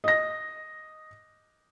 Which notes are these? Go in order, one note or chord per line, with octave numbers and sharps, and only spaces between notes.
D#5 A#6